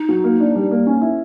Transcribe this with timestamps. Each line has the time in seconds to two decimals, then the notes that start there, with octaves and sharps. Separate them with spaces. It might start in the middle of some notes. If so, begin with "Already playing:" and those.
Already playing: D#4
0.09 F#3
0.24 A#3
0.40 D4
0.55 G3
0.71 A#3
0.87 C#4
1.01 E4